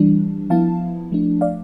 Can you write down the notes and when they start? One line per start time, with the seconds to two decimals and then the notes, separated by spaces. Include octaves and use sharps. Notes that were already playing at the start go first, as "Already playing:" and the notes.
Already playing: E3 G3 D4
0.50 F3 B3 E4 F5 A5
1.12 F3 A3 D4
1.41 D5 F5